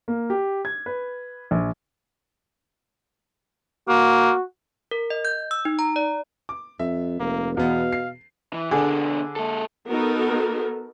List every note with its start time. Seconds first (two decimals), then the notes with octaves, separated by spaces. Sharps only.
0.08 A#3
0.30 G4
0.65 G#6
0.86 B4
1.51 A#1
3.88 A#3 F#4
4.91 A#4
5.10 D#5
5.25 G6
5.51 E6
5.65 D#4
5.79 A#5
5.96 D5
6.49 D6
6.79 F2 E5
7.20 F1 A#3
7.57 E2 B2 B3 F5
7.93 C7
8.53 E3
8.71 B2 D3 D4 G#4
9.36 G#3 A4
9.89 B3 D#4 F#4 A4 A#4